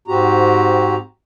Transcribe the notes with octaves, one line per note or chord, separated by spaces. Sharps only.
G#2 C4 F#4 G4 A#5